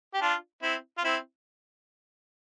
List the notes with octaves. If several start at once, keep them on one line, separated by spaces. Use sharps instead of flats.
G4
D4 F4
C4 E4
F4
C4 E4